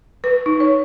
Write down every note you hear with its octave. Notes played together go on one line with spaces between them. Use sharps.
B4
D#4
C#5